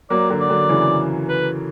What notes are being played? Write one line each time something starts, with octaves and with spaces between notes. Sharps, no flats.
F#3 A#3 D5
D3 F#3
D5
D3 F#3
C#3 E3
B4